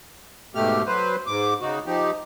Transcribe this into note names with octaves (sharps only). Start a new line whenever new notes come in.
G#2 B2 A3 G4 F6
F#3 B4 C5
G#2 D6
C#3 D#4 F#4
F3 D#4 G4